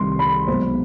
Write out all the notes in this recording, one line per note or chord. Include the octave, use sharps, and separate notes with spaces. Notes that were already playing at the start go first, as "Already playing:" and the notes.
Already playing: C2 C3 D#3 G3 C6
B5
B1 B2 G#3 C5